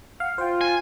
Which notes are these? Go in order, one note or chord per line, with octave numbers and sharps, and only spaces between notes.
F5 F#5
F4 C5 G5
G#5